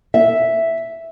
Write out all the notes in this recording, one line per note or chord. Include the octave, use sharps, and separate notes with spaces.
E5